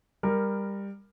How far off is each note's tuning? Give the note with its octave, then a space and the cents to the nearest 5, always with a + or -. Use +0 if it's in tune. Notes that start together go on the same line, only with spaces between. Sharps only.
G3 +20 A#4 +0